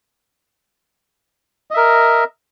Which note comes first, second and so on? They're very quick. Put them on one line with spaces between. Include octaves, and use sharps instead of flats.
D#5 E5 A#4